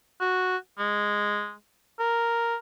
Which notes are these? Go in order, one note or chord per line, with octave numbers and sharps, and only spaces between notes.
F#4
G#3
A#4